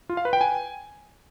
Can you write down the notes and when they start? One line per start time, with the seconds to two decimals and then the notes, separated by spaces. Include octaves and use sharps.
0.09 F4
0.17 F5
0.25 B4
0.33 G5
0.41 G#5